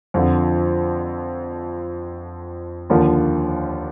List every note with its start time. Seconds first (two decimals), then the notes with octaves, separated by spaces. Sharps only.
0.14 F2 D3 F3
2.90 D#2 D3 F3 A#3